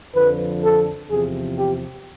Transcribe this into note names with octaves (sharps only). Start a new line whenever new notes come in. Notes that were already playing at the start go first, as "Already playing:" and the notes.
F2 D3 F3 B4
A4
E2 C3 F3 G#4
G4